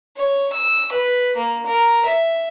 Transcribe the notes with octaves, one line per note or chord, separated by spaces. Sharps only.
C#5
E6
B4
A#3
A#4
E5